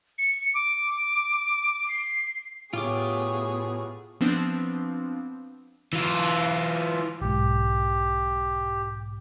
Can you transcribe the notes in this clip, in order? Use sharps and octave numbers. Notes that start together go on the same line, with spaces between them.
C#7
D6
C7
A2 B3 F4 G4 G#4 C#5 D6
F3 B3 C4 D4
E3 F4
B1 G#2 G4